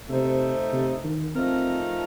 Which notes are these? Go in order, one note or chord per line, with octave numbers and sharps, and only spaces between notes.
C3 A3 D#4 A4 C5
C3
D#3
F3 A3 C4 D#4 A#4